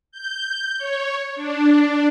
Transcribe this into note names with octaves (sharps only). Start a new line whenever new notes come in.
G6
C#5
D4